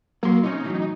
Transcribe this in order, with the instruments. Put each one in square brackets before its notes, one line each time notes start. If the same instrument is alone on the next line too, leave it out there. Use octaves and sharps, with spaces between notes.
[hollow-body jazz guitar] F#3 C6 [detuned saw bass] A#3
[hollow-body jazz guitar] C3 C#4 [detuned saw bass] D#4
[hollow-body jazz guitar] A2 E3 F#3